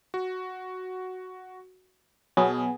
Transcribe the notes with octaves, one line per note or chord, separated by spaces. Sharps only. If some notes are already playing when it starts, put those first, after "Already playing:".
F#4
B2 F#3 B3 G#4